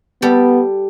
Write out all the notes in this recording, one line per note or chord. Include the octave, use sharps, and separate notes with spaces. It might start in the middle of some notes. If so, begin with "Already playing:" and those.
G3 B3 A4